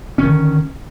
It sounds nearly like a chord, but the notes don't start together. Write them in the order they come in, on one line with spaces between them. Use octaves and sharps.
C#4 D#3 D3